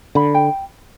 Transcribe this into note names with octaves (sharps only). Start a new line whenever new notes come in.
D3 B5
G5